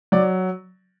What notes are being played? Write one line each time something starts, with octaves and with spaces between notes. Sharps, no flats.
F#3 D5